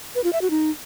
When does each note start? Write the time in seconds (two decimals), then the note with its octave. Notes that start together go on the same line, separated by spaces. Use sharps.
0.15 B4
0.24 F4
0.33 E5
0.42 F#4
0.50 D#4